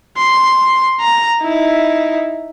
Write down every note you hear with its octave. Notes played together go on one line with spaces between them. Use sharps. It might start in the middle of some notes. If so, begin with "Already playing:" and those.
C6
A#5
D#4 E4